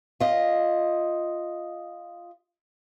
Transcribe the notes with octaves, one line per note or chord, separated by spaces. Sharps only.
F4 D#5